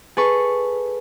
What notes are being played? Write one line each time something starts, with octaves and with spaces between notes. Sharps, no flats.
G#4 A4 B4 C#6